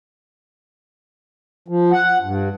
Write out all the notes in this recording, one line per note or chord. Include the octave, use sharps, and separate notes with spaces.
F3
F#5
G2